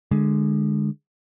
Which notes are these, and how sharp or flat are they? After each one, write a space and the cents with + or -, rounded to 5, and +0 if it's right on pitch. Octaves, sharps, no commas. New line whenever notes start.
D3 +20 G#3 +0